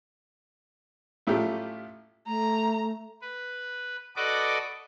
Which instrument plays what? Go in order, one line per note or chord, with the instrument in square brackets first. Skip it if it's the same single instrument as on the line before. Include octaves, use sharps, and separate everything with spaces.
[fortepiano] A1 A2 A3 F4 G4
[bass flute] A3 [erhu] A#5
[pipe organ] B4
F#4 A4 B4 D5 D#5 D6